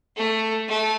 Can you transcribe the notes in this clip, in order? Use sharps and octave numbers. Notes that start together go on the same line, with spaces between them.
A3
A3